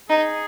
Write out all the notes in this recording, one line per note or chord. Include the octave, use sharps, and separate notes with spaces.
D#4 G#4